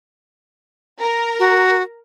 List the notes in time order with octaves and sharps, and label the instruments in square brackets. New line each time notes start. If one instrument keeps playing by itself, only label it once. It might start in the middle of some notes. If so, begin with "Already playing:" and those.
[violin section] A#4 A#5
[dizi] F#4